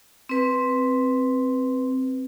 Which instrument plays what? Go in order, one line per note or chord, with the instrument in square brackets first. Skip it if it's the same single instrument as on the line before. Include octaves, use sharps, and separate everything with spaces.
[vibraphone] C4 B4